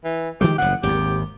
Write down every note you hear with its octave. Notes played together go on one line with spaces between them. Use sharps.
E3
D#3 F3 G#3 G4
F#1 A2 F#5
G#1 D#2 G4